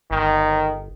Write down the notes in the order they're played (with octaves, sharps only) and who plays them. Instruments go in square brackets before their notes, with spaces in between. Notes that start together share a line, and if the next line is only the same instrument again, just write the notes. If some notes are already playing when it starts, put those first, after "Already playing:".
[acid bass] G1 [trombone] D#3